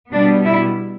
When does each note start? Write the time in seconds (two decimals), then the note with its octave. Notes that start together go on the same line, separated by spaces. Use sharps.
0.11 B2 G3 B3 D4
0.45 E4